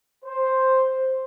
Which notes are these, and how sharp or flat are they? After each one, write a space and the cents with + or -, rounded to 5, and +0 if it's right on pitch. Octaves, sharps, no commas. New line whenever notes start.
C5 +5